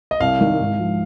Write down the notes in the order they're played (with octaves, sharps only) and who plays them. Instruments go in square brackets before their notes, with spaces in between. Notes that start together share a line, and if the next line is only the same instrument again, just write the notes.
[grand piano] D#5
[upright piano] C2 [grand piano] F5
[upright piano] D#3
G#2
F3